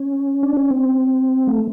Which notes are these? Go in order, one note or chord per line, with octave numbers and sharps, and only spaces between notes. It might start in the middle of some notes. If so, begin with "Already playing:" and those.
Already playing: C#4
D4
C#4
C4
A3